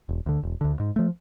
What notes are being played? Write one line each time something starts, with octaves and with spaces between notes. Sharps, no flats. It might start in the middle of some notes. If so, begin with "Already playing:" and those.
E1
D2 D3
E1
D2 D3
G#2
F3 A3